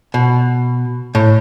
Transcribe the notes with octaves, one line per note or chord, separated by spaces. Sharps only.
B2
A2